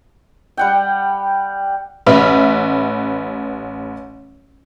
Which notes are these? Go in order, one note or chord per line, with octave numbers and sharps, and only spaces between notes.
G3 F#5 G5
A1 B4 E5 B5 F6